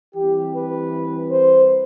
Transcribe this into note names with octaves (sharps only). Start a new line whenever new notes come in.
E3 G3 C4 G4
B4
C5